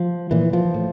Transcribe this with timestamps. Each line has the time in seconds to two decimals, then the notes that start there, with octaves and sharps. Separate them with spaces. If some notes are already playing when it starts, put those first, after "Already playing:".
Already playing: F3
0.31 A#2 E3
0.53 F3
0.74 A2